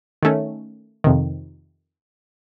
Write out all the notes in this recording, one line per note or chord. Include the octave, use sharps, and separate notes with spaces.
D#3 A3 C#4
F2 C3 D#3